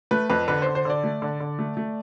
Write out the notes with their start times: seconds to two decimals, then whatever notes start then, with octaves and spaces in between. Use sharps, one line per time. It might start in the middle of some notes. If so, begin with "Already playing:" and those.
0.11 A3 B4
0.29 F2 B4
0.48 D3 B4
0.62 C5
0.66 D3
0.75 C5
0.85 D3 D5
1.04 A3
1.22 D3
1.40 D3
1.59 A3
1.77 A3